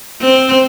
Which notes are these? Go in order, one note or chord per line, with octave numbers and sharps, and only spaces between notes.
C4